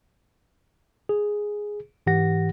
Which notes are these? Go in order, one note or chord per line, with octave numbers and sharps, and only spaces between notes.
G#4
G#2 E3 G4 F#5 A#6